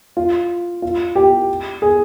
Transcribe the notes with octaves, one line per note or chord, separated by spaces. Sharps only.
F4
F4
G4
G#4